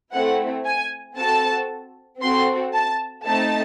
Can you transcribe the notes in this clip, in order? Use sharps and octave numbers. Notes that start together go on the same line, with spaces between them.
A3 C4 E4 F#5
G#5
C4 F#4 A4 A5
C4 F#4 A4 C6
A5
A3 C4 D#4 A5